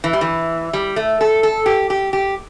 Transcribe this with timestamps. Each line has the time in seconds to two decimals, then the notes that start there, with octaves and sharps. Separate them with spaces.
0.04 E3
0.13 G3
0.21 E3
0.73 G3
0.96 A3
1.21 A4
1.43 A4
1.66 G4
1.90 G4
2.13 G4